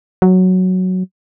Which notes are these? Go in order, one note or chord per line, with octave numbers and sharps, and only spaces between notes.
F#3